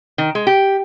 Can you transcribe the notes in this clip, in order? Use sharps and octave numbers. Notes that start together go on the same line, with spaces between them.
D#3
G#3
G4